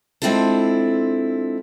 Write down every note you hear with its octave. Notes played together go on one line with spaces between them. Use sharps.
G#3 C4 D4 E4 F4 A4